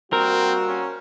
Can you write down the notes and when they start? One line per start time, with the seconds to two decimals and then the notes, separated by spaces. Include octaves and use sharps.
0.13 G3 A#3 C4 F#4 A#4
0.68 C#4